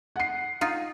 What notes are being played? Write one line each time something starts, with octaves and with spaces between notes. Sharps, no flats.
F#5 C7
D#4 F4